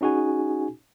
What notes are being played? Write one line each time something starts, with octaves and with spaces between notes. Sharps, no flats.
C#4 D#4 F#4 G#4 G#5